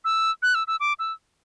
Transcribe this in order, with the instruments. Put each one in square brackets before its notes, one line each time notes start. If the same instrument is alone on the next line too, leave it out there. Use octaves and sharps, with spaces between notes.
[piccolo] E6
F#6
E6
E6
D6
E6